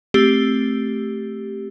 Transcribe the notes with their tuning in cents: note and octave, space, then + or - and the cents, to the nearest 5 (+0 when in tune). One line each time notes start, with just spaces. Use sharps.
A3 +0 C4 +5 G4 +0